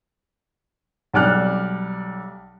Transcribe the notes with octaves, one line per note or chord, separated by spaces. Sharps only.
B1 G3 D5 F6 F#6